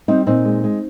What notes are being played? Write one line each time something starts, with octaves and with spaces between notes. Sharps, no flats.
G3 C4 D#4
A#2 C4 D#4
G#3
G#3